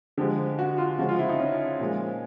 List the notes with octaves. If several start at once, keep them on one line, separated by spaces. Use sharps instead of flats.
D3 F3 G#3 G4
F#4
F4
C#3 F3 G#3 F#4
F4
E4
D#4
C#4
A#2 F3 G#3